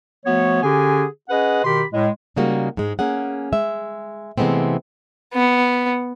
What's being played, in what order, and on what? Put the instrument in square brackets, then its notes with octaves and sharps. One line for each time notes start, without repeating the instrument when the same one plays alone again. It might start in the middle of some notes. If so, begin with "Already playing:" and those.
[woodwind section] F3 A3 B3 F#4 C#5
D3 C#4 G4 G#4 G#5
C#4 G#4 B4 D#5 F#5
B2 D#3 G4 B5 C6
A2 G#3
[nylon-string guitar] C#3 G3 G#3 A#3 D#4 F#4
G#2 G#3
A#3 C#4 G#4 F#5
G#3 E5
C3 E3 G#3 A3 B3 C4
[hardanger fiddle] B3